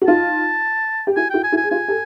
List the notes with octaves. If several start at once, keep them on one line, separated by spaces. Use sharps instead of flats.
F#4
D#4 F4 A5
G4
E4 F#4 G#5
E4 F#4 G5
G#5
E4 F#4
G#5
G#4
F4 G4 G#5
G4 A4